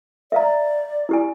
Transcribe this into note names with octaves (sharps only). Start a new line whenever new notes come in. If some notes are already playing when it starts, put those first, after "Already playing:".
D5 E5 F5 A#5
E4 G4 G#5